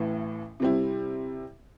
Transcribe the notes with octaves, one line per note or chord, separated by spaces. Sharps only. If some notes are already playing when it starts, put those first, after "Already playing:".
Already playing: A1 A2 E3
C3 G3 C4 E4